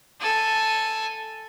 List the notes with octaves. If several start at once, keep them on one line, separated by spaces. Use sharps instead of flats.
A4 G#5